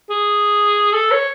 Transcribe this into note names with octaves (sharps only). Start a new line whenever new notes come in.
G#4
A4
C#5